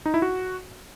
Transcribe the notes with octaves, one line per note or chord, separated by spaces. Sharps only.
D#4
E4
F#4